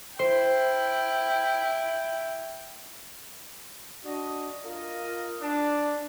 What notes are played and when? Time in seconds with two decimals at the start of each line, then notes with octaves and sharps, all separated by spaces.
0.19 E4 C5 G5
4.04 D4 F#4 D#5
4.64 F4 A#4 D#5
5.41 D4